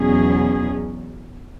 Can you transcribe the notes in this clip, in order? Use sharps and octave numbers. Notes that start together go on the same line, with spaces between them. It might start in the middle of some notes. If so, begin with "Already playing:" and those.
Already playing: E2 B2 F#3 C#4 G#4